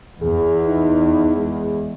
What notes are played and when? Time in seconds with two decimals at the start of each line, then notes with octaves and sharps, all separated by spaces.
0.22 E2 G#4
0.66 D#4
1.36 G#3